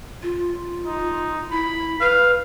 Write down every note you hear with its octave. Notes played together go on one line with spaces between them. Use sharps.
F4
D#4
E4 B5
B4 F5